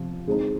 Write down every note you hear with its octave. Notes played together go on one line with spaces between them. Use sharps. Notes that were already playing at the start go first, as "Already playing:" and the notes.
Already playing: C3 F3
D3 G#3 C4 D#4